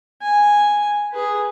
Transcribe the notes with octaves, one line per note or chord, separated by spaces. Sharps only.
G#5
G#4 B4